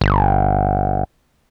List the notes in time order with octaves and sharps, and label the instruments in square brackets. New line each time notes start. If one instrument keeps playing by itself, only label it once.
[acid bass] G1